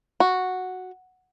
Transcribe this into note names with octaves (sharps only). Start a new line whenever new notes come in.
F#4